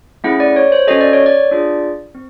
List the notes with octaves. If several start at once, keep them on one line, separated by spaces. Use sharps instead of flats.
A3 C#4 E4 G#4 F#5
D5
C#5
C5
C#4 F#4 A4 D#5
D5
C#5
D5
D4 F4 G#4
C4